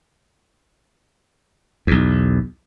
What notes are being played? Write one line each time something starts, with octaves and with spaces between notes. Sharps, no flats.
B1 E2